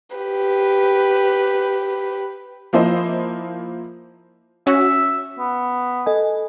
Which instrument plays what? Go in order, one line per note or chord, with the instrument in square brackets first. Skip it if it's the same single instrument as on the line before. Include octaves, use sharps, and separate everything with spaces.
[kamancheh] G4 B4
[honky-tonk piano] F3 A#3 E4 C5 D#5
[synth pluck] C#4 F#4 [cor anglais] E5
[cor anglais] B3
[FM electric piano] A4 D#5 G#5